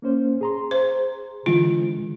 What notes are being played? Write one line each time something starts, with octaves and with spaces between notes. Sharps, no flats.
A#3 C#4 C5
G#4 A#5 C6
C5
D3 E3 G#3 F4